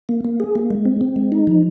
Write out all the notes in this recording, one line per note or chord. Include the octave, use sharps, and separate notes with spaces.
A#3
A#3
G#4
A#3
G#3
C4
C4
G#3
D#4
F3